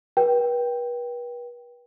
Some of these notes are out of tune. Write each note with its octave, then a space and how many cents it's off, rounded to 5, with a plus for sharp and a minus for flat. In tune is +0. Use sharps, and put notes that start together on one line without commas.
B4 -40 G5 +0